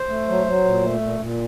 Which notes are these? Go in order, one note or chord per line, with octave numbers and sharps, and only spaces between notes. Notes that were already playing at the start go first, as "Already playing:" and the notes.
Already playing: C5
A3
F#3
F#3
A#2
A3
A#2
A#2